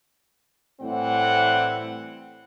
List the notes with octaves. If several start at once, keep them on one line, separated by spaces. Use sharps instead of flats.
A2 E3 G3 C4 F#5